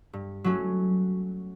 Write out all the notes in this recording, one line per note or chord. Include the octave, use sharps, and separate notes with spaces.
G2
F#3 A3 C#4 F#4